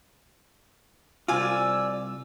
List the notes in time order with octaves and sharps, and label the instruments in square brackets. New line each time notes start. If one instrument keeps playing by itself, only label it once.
[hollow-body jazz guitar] C2 F4 [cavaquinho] D5 G#5 [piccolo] E6